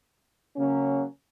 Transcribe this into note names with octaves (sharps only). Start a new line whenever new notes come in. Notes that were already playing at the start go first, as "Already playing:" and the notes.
C#3 F#3 A#3 C#4